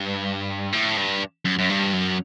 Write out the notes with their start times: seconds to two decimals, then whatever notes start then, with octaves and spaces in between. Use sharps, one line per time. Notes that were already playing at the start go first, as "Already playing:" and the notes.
Already playing: G2
0.73 A2
0.97 G2
1.45 F#2
1.59 F#2
1.70 G2
1.93 F#2